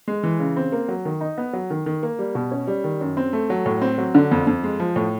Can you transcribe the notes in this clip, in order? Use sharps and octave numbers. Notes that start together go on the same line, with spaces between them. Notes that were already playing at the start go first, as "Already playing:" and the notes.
G#3
E3
C#3
C4
A#3
F#3
D#3
D#4
B3
F#3
D#3
D#3
A#3
G3
B2
C#4
G3
D#3
F#2
C4
A3
F#3
A2
C4
F#3
D3
F2
F2
G#3
F3
A2